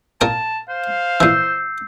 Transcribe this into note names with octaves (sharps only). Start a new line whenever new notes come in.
A#2 A#4 G5 A5
C5 F5
A#2 E3 E6 G6 C7